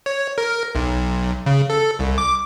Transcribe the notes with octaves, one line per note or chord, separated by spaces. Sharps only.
C#5
A#4
B1
C#3
A4
C2
D6